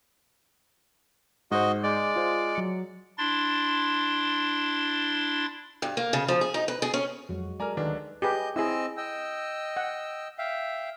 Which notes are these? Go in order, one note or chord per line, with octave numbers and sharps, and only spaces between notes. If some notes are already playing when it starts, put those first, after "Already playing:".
G#2 F#4 C5 D#5
G#3 D5
F4 C5
F#3 C#7
D4 E4 C6 A6
G2
A#3
C#3
F3
G#4
D#4
B4
G#4
C#4
F2 F#3 G#3 F#4
G#3 A4 A#4 D5 G#5 A#5 F6
D2 D#3 D4 A4 B4
G4 G#4 B4 D#5 G6
C4 E4 G#4 D#5 E6
D#5 G5 E6
F#5
E5 F5 G5